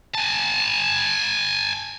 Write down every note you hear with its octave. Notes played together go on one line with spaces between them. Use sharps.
G#5 A5